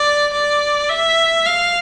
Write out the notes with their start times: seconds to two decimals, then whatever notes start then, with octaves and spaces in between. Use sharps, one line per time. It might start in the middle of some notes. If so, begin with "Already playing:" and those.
Already playing: D5
0.33 D5
0.89 E5
1.46 F5